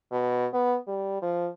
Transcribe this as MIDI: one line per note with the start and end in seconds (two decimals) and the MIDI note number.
0.12 0.46 47
0.54 0.77 59
0.87 1.17 55
1.22 1.48 53